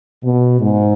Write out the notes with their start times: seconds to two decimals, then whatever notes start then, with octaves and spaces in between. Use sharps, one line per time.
0.23 B2
0.60 G#2